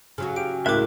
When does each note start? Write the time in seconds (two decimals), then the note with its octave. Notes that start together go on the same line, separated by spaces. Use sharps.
0.18 C#3 F#3 F#4
0.36 G4 D7
0.66 C#2 A2 G#3 A#4 E5 D6 F#6